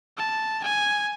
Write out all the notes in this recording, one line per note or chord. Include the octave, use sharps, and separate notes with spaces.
A5
G#5